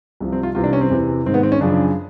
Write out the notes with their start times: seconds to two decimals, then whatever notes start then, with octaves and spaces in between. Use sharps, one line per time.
0.20 C2 C3 F3
0.32 C4
0.43 F4
0.55 C2 C3 E3 F4
0.64 D4
0.73 C#4
0.81 C4
0.90 E2 C3 E3
1.25 G#2 D#3 C4
1.34 B3
1.43 C4
1.52 C#4
1.61 F#2 C#3 F3 D4